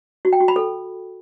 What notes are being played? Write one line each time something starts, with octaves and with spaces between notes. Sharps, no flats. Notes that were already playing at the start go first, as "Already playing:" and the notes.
F#4
G5
F#4
B5
A4